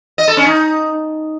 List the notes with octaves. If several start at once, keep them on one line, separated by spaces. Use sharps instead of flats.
D#5
A4
C#4
D#4